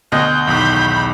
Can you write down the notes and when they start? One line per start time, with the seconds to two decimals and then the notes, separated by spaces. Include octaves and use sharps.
0.12 D2 B2 D#5 G6
0.47 B1 E2 D#3 B5